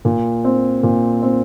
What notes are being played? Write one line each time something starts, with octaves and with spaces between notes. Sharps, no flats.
A#2
C4
A#2
C4